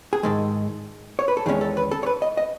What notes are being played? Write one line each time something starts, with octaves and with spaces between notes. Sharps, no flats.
G#4
G#2 D#3 G#3 A4
C#5
B4
A4
E2 D#3 G#3 C#4 G#4
A4
B4
A4
C#5
B4
D#5
D#5